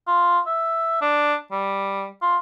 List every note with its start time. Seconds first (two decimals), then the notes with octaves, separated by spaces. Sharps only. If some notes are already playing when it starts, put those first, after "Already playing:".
0.07 F4
0.46 E5
1.01 D4
1.52 G3
2.22 F4